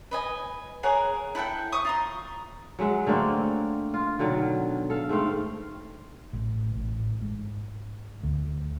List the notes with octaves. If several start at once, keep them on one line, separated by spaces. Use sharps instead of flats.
B4 D#5 G#5
G#4 A#4 C#5 F#5
E4 A4 F#5 G5
E5 C#6 D#6
F4 A#5 C6
F#3 G#3 E5 F#5
D3 A3 A#3 C4
F4
B2 D3 D#3 F#3
A4 F5
G#2 A3 C4 F5
A1
A1
G#2
D2